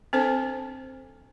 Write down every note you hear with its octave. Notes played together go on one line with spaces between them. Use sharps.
C4 D4 A4 C5 A5